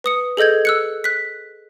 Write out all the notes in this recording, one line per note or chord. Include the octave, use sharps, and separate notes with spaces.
B4 D#6 C#7
G#4 A4 D#5 G6 G#6
E6 F#6 C#7
F#6 B6